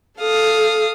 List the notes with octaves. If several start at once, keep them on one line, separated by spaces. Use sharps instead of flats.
A4 F5 D#6